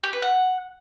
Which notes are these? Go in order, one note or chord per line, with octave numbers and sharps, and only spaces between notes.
G4
B4
F#5